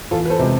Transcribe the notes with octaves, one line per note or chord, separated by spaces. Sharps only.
E2 F4 A4
B4
A4 C5
C3 G#3